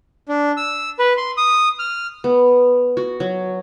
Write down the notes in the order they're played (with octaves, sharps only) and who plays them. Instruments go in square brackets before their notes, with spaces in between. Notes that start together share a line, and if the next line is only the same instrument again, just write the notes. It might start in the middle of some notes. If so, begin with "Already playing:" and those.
[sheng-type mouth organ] D4
E6
B4
C6
D#6
F6
[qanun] B3
F#4
F#3